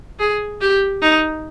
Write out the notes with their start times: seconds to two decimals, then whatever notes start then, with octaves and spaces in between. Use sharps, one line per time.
0.19 G#4
0.61 G4
1.02 D#4